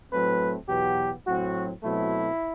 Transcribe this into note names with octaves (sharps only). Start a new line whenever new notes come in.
A2 F#3 A3 C4 B4
E2 B2 F#3 B3 G4
A2 F#3 C4 F#4
B2 F#3 A3 C4 E4